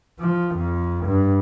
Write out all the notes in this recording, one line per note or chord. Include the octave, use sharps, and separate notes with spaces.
F3
F2
G2